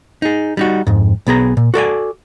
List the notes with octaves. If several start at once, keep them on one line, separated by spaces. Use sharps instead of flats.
D#4 G#4
G3 D#4 F#4
F2 G#2
B1 B3 G#4 A#5
A#2
F#4 A4 D5 G#5